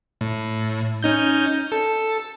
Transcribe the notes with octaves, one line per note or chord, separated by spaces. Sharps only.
A2
C#4 D#4 G6
A4